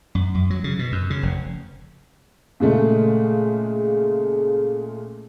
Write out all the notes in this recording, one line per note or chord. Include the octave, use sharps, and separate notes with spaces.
F#2
F#2
F#3
C#3
B2
F#2
C#3
F1
A#2 C#3 G#3 A3